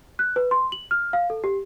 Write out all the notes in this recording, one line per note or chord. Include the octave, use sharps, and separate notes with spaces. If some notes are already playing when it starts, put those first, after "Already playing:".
F#6
B4
C6
F#7
F6
F5
A4
G4